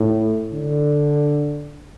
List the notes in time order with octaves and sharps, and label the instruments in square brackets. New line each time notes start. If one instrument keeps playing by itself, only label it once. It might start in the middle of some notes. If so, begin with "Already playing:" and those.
Already playing: [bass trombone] A2
D3